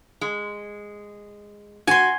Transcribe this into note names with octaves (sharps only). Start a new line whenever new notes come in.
G#3
F#4 G#5 C6